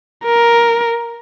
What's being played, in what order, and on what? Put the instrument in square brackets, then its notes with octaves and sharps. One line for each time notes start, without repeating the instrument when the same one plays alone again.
[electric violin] A#4